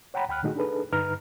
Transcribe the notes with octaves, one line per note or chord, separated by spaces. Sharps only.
C#5 F#5 G5 A#5 B5
D2 G5 B5 F6 F#6
A#2 D#3 A3 D#4 F#4 G#4
D4 D#4 G#4 A4 B4
G2 D3 D#4 B4 A#5 F6